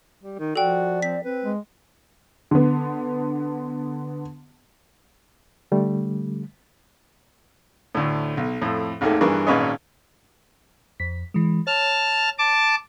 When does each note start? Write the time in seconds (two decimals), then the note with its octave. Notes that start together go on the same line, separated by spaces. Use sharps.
0.23 G3
0.39 D#3
0.56 F3 F#4 A4 D5 G5
1.02 C4 B6
1.24 C4 B4
1.44 G#3
2.51 D3 B3
5.72 D3 G3 A3
7.95 D2 A2
8.37 B1
8.62 F2 A2
9.01 G#1 D#2 D#3 A3
9.21 G2 E3 G#4 A#4 C#6
9.47 G#1 A#2 C#4 B4 C#5 D#5
11.00 F2 B6
11.34 E3 G#3
11.67 C#5 A5 F6
12.38 A5 D6